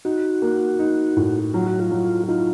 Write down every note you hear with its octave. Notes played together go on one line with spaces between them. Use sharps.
D#4 F#4
A#3
D#4
A2
F#3 F4
F#4
F4
F#3
D#4 F4